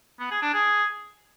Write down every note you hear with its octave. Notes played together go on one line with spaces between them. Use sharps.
B3
G#4
D4
G#4